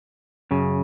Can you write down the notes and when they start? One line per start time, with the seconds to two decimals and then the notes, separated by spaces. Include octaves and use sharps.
0.51 F#2 C#3